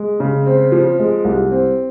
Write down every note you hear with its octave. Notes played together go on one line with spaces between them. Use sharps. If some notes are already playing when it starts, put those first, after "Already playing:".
Already playing: G#3
C#3
C4
F3
G#3
C2
C4